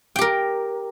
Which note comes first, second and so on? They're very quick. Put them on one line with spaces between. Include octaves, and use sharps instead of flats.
G5 G4 A#4